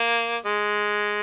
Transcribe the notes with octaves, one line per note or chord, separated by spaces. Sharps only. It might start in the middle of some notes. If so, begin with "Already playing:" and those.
Already playing: A#3
G#3